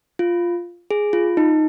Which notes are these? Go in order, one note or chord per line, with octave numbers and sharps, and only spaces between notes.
F4
G#4
F4
D#4